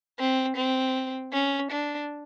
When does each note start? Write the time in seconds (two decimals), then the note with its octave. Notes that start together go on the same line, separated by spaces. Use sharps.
0.19 C4
0.57 C4
1.33 C#4
1.71 D4